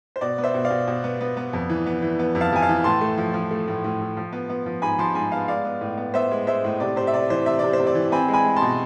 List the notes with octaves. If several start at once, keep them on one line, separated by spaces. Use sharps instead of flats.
C5
B2 D5
B3
C5 E5
B2
D5 F5
B2
B2
B3
B3
B3
F2
E3
B3
E3
B3
F2
F5 A5
F2 G#5
F5 A5
E3
A2 A5 C6
A3
F3
F3
A3
A2
A2
A2
F3
B3
B3
F3
G#2 G#5 B5
F3 A5 C6
G#2 G#5 B5
B3 F5 A5
G#3 D5 F5
B3
A2
B3
B3 C5 E5
G#3
G#3 C5 E5
A2
C3 D5
C3 C5
E5
C3 D5
E3 C5
C3 E5
C3 D5
C5
C3
D5
E3
C4 G#5 B5
G#3
G#5 B5
G#3
A5 C6
B2